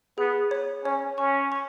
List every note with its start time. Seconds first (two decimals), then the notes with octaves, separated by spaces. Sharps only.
0.18 B3 G#4
0.51 C#5
0.84 C#4 C#5
1.18 C#4 C#6
1.52 C#6